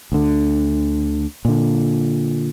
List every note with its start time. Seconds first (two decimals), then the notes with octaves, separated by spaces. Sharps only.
0.12 D2 D3
1.45 A#2 D3